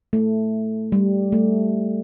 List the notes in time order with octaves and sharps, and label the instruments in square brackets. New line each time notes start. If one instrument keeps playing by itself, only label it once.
[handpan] A3
G3
A3